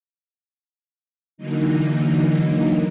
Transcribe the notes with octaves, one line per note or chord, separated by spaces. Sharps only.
D3 E3 F#3 A#3 D#4